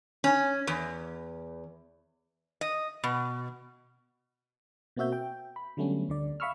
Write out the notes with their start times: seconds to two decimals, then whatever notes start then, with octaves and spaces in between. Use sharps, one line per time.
0.24 C#4
0.67 E2
2.61 D#5
3.04 B2
4.96 B2 A#3 C4 F#4 E5 G6
5.12 G5
5.56 B5
5.77 D3 F#3 G3 A3 B3 C#4
6.09 D2 D3 D5
6.40 E5 F5 B5 C#6 E6 F6